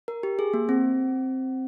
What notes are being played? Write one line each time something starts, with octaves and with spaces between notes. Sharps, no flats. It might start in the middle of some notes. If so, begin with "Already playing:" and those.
A#4
G4
G#4
A#3
C4